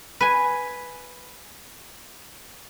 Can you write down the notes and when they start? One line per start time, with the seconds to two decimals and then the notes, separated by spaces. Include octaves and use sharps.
0.21 B4 G#5